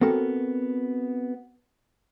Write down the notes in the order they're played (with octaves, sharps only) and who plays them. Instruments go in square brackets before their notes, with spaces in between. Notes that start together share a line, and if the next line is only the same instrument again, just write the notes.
[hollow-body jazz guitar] B3 C4 F#4 A4 A#4